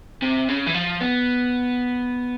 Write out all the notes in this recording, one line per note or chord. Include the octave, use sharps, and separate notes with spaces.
C3
C#3
E3
F3
B3